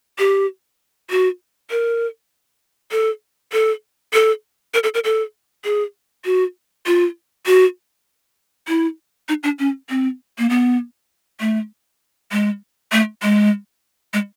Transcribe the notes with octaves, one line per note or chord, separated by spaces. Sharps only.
G4
F#4
A#4
A4
A4
A4
A#4
A4
A#4
A4
G#4
F#4
F4
F#4
E4
D#4
D4
C#4
C4
A#3
B3
A3
G#3
A3
G#3
G#3